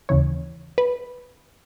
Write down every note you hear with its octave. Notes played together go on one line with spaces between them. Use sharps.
D#2 C#3 E3 C#5
B4